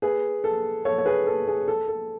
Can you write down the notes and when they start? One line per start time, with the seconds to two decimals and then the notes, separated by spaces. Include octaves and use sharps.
0.02 G#4 B4
0.44 A4
0.85 A4 C#5
0.98 C#5
1.06 G#4 B4
1.27 A4
1.48 G#4
1.68 A4
1.88 A4